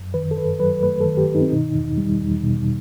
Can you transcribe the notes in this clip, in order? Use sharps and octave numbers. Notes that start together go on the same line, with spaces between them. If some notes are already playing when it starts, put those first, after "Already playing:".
Already playing: F#2
D#3 B4
A4
G2 B4
F#3 B4
A3 B4
A4
D#3
G4
G2
D#4
C4
B2 D#4
E2
G3
E2
B2